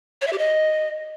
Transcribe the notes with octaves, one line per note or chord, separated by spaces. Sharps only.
C#5
E5
G4
D#5